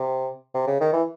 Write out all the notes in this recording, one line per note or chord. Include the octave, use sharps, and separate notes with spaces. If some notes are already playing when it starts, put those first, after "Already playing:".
Already playing: C3
C3
C#3
D#3
E3